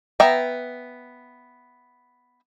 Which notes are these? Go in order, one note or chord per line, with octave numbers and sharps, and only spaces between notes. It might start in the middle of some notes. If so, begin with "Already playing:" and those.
B3 E5 G5 A#5